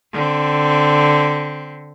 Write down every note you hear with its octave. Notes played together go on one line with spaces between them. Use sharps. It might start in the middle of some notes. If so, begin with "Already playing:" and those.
D3 C4